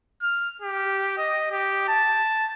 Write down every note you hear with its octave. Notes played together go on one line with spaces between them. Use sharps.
F6
G4
D#5
G4
A5